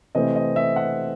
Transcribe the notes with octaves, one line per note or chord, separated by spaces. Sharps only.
C3 E3 A3 C4 D#5
D#5
E5
F#5